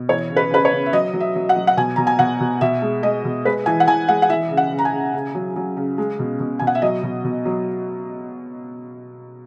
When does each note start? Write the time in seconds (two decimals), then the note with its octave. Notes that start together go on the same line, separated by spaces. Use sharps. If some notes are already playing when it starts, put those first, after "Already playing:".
Already playing: B2
0.09 E3 C#5
0.30 C#3
0.36 B4
0.51 C#3 B4
0.65 C#5
0.72 C#3
0.86 E5
0.92 F#3 D#5
1.14 F#3
1.20 E5
1.35 F#3
1.49 F#5
1.56 F#3
1.67 F#5
1.77 B2 G#5
1.96 B2 A#5
2.07 G#5
2.19 B2 F#5
2.40 B2
2.61 B2 E5
2.82 G#3
3.03 G#3 D#5
3.25 B2
3.45 G#3 B4
3.66 E3 G#5
3.80 F#5
3.87 E3 G#5
4.08 G#3 F#5
4.22 F#5
4.29 E3 E5
4.51 C#3
4.57 F#5
4.71 C#3
4.78 A#5
4.85 G#5
4.93 C#3
5.14 C#3
5.35 F#3
5.56 F#3
5.77 C#3
5.98 G#3
6.19 B2
6.40 B2
6.59 B2 G#5
6.67 F#5
6.75 E5
6.82 F#3 D#5
7.03 B2
7.24 B2
7.45 F#3